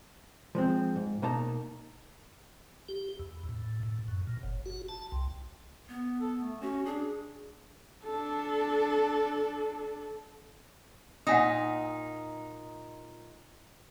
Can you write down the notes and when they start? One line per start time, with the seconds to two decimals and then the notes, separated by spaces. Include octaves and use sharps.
0.55 F3 G#3 C4
0.96 G#2
1.22 B2 A#3 D#4 A5 A#5
2.89 G4
3.19 E2
3.49 A2
3.83 A2
4.08 F#2
4.27 A#2
4.43 F#1
4.66 F#4
4.89 A5
5.12 C2
5.89 B3
6.20 A4
6.42 A3
6.62 C#4 F#4
6.86 D4 G#4
8.04 D4 A4
11.27 A#2 D#4 F#5 G#5 D#6